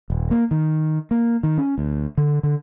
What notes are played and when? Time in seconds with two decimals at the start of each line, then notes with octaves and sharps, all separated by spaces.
0.10 D#1
0.31 A#3
0.51 D#3
1.11 A#3
1.43 D#3
1.58 C#4
1.78 D2
2.18 D3
2.43 D3